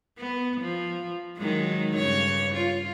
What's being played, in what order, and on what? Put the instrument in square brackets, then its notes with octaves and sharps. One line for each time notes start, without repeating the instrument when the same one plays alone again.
[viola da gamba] B3
F3
D#3 F#3 G#3
G2 C#3 C#5
F4